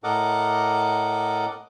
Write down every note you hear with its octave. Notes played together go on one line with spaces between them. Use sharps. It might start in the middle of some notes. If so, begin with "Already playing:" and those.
A2 A4 A#4 D#5 F#5 D6